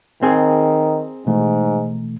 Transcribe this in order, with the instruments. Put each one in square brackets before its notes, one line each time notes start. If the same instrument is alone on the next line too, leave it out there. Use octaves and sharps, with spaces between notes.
[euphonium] D#3 [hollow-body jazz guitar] C4 G#4
[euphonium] G#2 [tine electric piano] B2 E3 A3